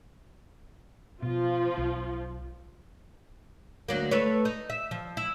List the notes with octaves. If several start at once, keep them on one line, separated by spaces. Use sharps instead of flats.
B2 F3 F4
B1
D2 F#3 A#3
A3 B4 C#5
D#4
E5
F3
E4